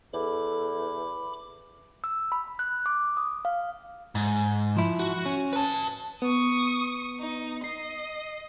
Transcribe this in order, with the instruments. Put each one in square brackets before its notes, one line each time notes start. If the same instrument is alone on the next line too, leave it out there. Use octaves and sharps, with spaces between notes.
[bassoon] E2 [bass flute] A4 [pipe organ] B5 D6
[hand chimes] E6
B5
F#6
D6
D#6
F5
[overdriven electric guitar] G#2
[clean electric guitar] F3 E4
[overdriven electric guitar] F#4
[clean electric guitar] C#4
[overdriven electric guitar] B4 A5
[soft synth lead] B3 [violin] C#6 D#6
[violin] D#4
[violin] D#5 [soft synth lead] C7